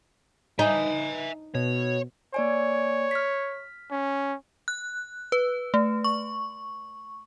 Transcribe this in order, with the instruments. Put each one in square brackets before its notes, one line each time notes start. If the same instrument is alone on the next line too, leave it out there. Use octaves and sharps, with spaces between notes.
[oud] D#4 [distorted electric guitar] E5 G#5
[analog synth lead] B2 [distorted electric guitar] C#5
[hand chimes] A#3 D5 G#5 [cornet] C#5
[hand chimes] F6 B6
[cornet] C#4
[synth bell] F#6
B4
A3
C#6